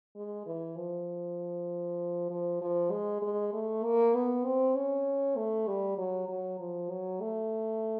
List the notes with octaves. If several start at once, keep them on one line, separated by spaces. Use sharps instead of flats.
G#3
E3
F3
F3
F3
G#3
G#3
A3
A#3
B3
C4
C#4
A3
G3
F#3
F#3
F3
F#3
A3